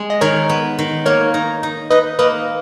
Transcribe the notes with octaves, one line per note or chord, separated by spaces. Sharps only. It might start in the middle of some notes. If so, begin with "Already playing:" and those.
Already playing: G#3
D#5
D#3 A#4 C#5
B3
D#3
A#3 A#4 C#5
D#4
D#4
D#4 B4 D#5
A#3 B4 D#5